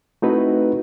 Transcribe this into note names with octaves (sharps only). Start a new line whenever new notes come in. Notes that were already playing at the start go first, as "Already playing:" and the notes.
A3 C4 D#4 E4 F#4 B4